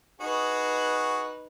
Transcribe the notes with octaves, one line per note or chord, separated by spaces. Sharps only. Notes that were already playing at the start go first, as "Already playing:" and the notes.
D#4 F#4 G#4 B4